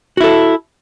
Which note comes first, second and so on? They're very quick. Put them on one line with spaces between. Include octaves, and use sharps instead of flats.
F#4 E4 A4